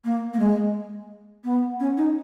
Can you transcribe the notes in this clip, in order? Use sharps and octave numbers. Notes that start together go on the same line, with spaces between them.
A#3
A#3
G#3
B3
C#4
D#4